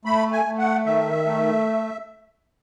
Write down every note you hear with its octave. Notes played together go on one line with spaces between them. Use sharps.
A3 B5
G#5
A3
F#5
D#3 E5
A3